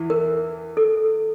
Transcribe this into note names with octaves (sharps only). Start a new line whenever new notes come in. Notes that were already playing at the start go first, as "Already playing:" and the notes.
Already playing: E2 E3
A#4
A4